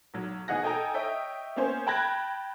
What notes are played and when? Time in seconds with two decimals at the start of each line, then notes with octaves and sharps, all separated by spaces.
0.14 B1 F#3
0.48 B2 D#4 G#4 F#5 A#6
0.63 A4 D#5 G5 G#5 A#5
0.94 C#5 D#5 E5 G5
1.56 A#3 B3 C#4 C5
1.87 G5 A5 B5 F#6 G#6 A#6